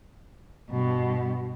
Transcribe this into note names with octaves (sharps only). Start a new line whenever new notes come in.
G2 B2